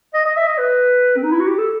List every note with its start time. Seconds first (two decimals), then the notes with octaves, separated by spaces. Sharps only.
0.14 D#5
0.25 D#5
0.36 E5
0.47 D#5
0.58 B4
1.16 C4
1.23 D#4
1.32 E4
1.40 F#4
1.47 G4
1.58 A4